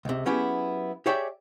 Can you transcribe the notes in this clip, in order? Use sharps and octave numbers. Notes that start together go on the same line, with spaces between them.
C#2 C3
F#3 B3 C#4 E4 G4 G#4
G4 G#4 C#5 D5 E5 G5